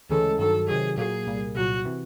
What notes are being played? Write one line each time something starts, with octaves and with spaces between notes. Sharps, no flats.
D2 C#3 E3 G#3 C#4 A4
G2 D#3 F#3 A4
C3 D#3 F#3 G#4
A#2 F#3 A#3 G#4
C2 A#2 G3 A#3
C2 A#2 F#3 F#4
C3 E3